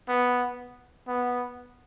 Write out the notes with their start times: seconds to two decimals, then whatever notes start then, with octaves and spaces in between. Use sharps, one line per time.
0.09 B3
1.08 B3